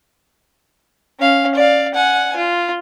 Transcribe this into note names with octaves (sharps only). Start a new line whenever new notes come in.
C#4 F5
D5 F5
F#5 G#5
F4